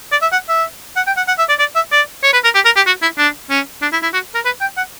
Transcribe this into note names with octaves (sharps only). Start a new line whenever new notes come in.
D5
E5
F#5
E5
F#5
G5
F#5
F#5
E5
D5
D5
E5
D5
C#5
B4
A#4
G4
A#4
G4
F#4
E4
D4
C#4
D4
E4
E4
F#4
A#4
B4
G5
F#5